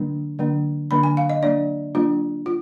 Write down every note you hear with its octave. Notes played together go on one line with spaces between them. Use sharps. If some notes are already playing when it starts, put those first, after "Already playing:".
Already playing: D3 F#3 A#3 D4
D3 F#3 A#3 D4
D3 F#3 A#3 D4 B5
G#5
F5
D#5
F#3 A#3 D4 D5
F#3 A#3 D4 F4
F4